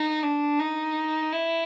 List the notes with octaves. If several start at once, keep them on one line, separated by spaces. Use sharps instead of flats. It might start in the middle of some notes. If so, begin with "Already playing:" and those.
Already playing: D#4
D4
D#4
E4